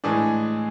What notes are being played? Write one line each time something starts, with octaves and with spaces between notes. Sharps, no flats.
A2 E3 G#3 D4 G#4